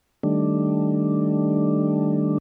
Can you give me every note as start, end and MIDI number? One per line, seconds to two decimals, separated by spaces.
0.23 2.38 51
0.23 2.38 55
0.23 2.38 57
0.23 2.38 62